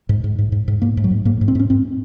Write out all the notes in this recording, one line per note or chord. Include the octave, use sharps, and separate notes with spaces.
G#2
G#2
G#2
G#2
G#2
G#2 A#3
G#2
F#3
G#2
G#2 A#3
G#2
C4
G#2 C#4
G#2 C4